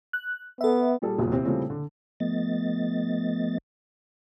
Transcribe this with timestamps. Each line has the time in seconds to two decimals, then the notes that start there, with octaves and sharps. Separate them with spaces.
0.13 F#6
0.61 B3 A4 E5
1.02 A#2 G3 G#4 A4
1.19 F#1 B1 E2 A#2
1.31 D#2 C3 E3 C4
1.45 A#2 C#3 G3 A3 C4 E4
1.70 D3
2.20 F3 A3 B3 D#5 A6